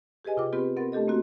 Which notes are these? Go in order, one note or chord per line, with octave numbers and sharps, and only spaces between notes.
G4 G#4 B4 D#5 G#5
C3 F4 G5 D6
B3 C4 F4 G4 B4
B3 C4 A#4 F#5 A6
A3 D4 G4 A4 D#5
A#3 C4 F#4